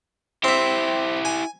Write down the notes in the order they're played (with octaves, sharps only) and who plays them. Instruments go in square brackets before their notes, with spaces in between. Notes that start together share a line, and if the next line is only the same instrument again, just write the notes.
[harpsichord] C4 E5 [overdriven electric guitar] E4 G4
[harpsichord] G#5